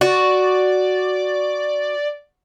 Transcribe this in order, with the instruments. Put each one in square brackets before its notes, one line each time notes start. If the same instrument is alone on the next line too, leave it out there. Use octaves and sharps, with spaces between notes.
[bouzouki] F#4 [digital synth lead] D5